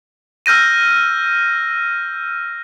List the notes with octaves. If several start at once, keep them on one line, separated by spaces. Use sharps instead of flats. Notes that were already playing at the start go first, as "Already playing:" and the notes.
E6 F6 G6 A#6 D#7